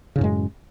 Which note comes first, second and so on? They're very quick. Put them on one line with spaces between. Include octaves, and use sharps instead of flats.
C#3 A2 F#2 G#3